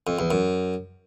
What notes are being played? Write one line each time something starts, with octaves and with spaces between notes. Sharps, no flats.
F2
E2
F#2